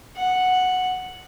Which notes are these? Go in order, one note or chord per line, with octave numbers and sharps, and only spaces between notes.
F#5